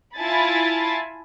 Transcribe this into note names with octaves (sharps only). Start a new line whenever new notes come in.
E4 F4 G#5 A5 B5 A6